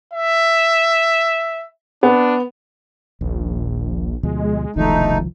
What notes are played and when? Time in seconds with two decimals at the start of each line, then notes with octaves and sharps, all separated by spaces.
0.14 E5
2.03 B3 D4
3.21 D#1 A#1
4.23 D2 B2 F3 G#3
4.76 E1 C2 D#3 F3 A3 D#4